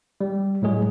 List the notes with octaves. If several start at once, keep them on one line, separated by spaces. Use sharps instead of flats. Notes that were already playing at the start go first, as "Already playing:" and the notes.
G3
A2 F#3 G#3 G#4